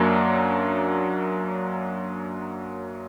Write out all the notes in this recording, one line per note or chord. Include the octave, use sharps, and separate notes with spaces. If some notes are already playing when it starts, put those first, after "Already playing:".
Already playing: F#2 F#3 A#3 D4